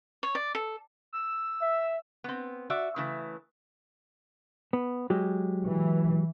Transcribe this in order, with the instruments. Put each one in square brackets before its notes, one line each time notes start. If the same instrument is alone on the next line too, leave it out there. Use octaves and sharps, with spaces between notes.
[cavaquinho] C#5
D5
A4
[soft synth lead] E6
[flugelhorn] E5
[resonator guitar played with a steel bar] B3 C4
F#4 D5 E5
C#3 E3 A3
[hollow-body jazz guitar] B3
F#3 G#3 G4
[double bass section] E3